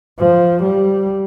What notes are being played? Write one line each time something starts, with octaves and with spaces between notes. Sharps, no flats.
F3
G3